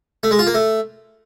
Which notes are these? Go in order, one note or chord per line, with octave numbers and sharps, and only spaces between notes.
A3
G#3
F4
A#3
A3